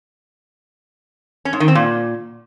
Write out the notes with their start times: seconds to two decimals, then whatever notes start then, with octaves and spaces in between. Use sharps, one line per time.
1.45 C#4
1.53 G#2
1.60 D#3
1.68 C4
1.75 A#2